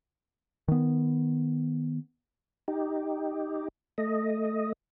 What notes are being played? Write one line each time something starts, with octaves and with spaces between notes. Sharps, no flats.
D#3 B3
D#4 G4
A3 D#5